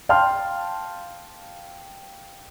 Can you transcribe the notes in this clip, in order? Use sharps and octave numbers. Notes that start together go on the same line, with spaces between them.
F5 G5 A5 C6 F6